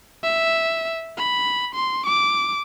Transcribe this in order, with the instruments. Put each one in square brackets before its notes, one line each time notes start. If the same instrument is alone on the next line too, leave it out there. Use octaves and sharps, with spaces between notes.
[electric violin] E5
B5
C6
D6